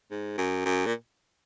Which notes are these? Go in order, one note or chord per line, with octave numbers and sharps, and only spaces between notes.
G#2
F#2
F#2
A#2